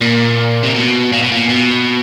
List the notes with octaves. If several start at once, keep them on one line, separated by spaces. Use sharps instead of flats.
A#2
C3
B2
A#2
B2
A#2
B2